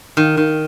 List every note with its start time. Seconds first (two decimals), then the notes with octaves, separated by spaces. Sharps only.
0.17 D#3
0.37 D#3